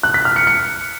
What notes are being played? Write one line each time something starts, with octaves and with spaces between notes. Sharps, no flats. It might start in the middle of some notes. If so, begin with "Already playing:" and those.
F#6
B6
F6
C#7
C#7